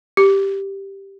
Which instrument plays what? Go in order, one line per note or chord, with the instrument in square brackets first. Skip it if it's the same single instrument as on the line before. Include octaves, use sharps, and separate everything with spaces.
[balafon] G4